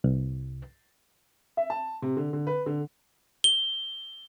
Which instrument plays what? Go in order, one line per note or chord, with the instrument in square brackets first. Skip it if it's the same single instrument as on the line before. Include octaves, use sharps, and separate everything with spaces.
[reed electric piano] C2
[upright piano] E5
A5
C3
D3
D3
B4
D3
[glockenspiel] G7